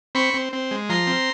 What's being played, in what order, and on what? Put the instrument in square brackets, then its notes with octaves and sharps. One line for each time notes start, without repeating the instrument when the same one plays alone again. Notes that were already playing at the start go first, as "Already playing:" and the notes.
[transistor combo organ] C4 B5 C#6
C4
C4
G#3
F3 A#5 C6
C4